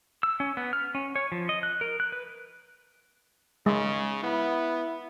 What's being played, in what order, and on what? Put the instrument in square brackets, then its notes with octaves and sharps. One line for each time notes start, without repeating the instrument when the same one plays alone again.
[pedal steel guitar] E6
C#4
B3
F6
C#4
C#5
F3
D#5
F#6
A#4
F#6
B4
[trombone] C#3 [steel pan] G#3
[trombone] B3 [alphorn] E4